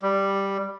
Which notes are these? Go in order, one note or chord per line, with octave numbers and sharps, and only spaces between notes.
G3